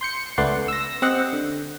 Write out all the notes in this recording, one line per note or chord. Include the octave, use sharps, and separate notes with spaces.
C6 G6 C#7
C#2 A3 B3 D5 F#5 C6
E6 A#6
C4 G4 C5 D#5 F#5
D3